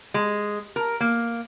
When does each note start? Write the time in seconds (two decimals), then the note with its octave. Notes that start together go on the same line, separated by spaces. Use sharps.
0.14 G#3
0.76 A#4
1.00 A#3